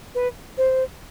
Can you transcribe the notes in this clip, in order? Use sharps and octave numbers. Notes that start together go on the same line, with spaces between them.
B4
C5